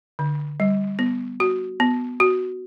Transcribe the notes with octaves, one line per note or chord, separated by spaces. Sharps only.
D3
G3
B3
F#4
B3
F#4